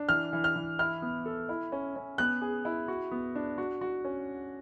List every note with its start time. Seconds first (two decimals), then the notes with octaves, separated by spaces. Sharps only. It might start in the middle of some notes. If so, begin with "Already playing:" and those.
Already playing: D4
0.09 E3 F6
0.33 E3
0.44 F6
0.56 E3
0.79 E4 F6
1.02 B3
1.26 A4
1.49 E4
1.72 C#4
1.96 C#4
2.18 B3 F#6
2.42 G#4
2.65 E4
2.88 F#4
3.11 B3
3.35 D4
3.58 F#4
3.81 F#4
4.05 C#4